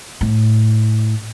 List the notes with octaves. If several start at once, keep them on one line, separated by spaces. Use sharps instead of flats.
A2